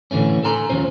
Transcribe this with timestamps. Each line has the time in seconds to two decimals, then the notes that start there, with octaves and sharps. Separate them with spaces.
0.11 A2 D3 E3 A3 C#4
0.44 A4 G#5 A#5 C6
0.69 D#2 E3 F3 C#4 C5